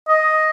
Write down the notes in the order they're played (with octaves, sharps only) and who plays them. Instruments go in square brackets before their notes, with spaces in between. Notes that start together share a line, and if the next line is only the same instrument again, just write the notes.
[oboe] D#5